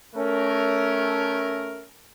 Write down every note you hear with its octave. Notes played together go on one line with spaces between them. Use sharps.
A3 C#4 A#4